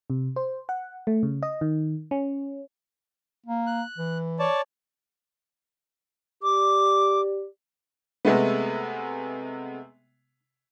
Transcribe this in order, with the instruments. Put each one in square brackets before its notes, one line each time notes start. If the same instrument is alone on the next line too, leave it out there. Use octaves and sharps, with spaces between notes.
[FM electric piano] C3
C5
F#5
A3
C#3
D#5
D#3
C#4
[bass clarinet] A#3
[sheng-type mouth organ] F#6
[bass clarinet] E3
[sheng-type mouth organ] C#5 D5 A5
[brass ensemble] G4 D5 [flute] D6
[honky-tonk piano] C3 G#3 A3 B3